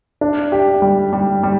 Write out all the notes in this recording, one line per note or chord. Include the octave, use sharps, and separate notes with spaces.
D4
G4
G3
G3
G3